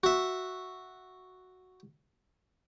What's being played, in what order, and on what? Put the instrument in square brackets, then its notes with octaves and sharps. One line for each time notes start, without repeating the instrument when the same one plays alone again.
[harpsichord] F#4 E5